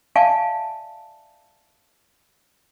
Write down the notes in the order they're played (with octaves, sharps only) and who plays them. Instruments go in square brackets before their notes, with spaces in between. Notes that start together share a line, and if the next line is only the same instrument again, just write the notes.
[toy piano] D5 E5 F5 G#5 A5